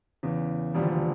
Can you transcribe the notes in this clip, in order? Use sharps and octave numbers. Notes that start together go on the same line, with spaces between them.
E2 C#3 E3
E1 D#2 D3 F3 G3